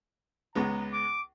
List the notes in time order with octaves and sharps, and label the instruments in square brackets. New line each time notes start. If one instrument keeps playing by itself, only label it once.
[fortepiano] C#2 G#3 B3 [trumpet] A#5
[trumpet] D6